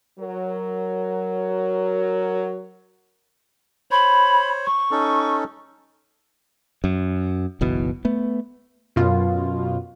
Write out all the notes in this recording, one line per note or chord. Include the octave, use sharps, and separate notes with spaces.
F#3 A#4
C5 C#5 B5
C#6
C#4 D#4 A4
F#2
F#1 B1 B2 E3
A3 B3
F#2 B2 F4